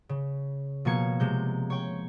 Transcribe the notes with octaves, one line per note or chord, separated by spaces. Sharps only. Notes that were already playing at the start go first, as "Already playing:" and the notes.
C#3
B2 F3 A#3 G#6 C#7
C3 G#3 G6
C#5 G5